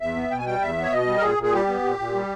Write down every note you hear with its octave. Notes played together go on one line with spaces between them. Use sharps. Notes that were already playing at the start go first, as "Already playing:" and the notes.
E2 E5
B3
B2 G5
G#5
G3 G5
E2 E5
B3
C#5
B2 D#5
G3
A#4
A#2 G#4
A#2
G#4
G3 G4
B3
A#2
A#2
G3